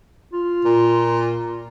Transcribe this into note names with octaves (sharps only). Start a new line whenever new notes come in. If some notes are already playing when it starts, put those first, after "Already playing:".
F4
A#2